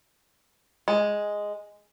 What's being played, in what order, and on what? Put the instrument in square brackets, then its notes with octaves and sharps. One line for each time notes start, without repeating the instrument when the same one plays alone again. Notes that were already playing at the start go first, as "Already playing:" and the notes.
[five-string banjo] G#3